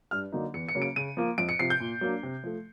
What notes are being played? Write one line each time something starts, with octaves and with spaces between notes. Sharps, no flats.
G2 F6
D3 F#3 A#3 D#4
E2 C#7
C#7
C#3 F#3 A#3 C#4
D7
C#3 D#7
F3 A#3
F2 D7
C#7
C3 F3 C7
G6
A#2
F#3 A#3 D4
C3
F3 A3